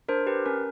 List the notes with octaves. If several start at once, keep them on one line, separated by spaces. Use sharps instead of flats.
D4 A#4 C5
G4 B4
C#4 A#4